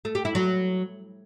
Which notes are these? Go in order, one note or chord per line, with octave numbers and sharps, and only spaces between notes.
A3
G4
E4
F#3